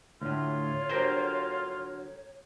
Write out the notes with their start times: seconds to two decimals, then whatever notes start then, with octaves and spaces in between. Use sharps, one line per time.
0.22 D2 A2 F4 C#5
0.89 D3 F#3 B3 G4 A#4 C5